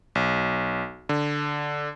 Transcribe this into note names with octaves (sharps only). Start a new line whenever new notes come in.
B1
D3